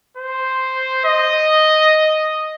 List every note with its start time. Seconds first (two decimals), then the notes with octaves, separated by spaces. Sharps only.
0.17 C5
1.05 D#5